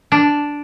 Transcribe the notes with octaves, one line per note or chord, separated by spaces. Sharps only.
D4